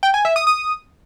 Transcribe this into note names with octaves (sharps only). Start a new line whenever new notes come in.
G5
G#5
E5
D#6
D#6